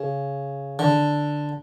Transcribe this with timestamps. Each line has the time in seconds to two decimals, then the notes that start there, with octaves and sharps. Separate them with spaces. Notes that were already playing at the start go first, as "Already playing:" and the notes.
Already playing: C#3
0.79 D3